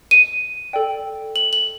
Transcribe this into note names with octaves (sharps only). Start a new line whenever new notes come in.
D#7
A4 D5 G5
F#7
F#7